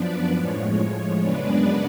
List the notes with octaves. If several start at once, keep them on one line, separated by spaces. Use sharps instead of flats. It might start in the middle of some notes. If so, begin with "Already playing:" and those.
Already playing: F#2 F3 B3 D4 B4 D5
A2 F3 G#3 C#5
F#2 C#3 G#3 B3 D4 B4 D5